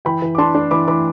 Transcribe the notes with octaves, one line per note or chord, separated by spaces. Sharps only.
E3 G5 B5
E3
D6
D4 A5 C6
D4
E3 B5 D6
E3 B5 D6